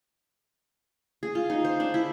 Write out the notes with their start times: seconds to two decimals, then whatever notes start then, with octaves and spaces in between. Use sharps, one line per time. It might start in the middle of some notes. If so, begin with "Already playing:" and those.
1.23 G#4
1.35 F4
1.50 D#4
1.65 C5
1.80 D4
1.94 E4